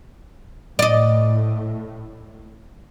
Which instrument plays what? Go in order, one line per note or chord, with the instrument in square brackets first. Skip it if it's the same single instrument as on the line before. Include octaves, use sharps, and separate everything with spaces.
[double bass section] A2 [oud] D5 D#5